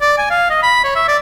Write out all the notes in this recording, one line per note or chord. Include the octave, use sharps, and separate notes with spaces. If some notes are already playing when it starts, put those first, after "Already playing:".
D5
G#5
F5
D#5
B5
C#5
E5
D5